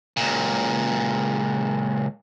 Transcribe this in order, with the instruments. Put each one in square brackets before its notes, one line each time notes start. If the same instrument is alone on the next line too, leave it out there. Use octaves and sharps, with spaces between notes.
[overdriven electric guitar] C#2 A#2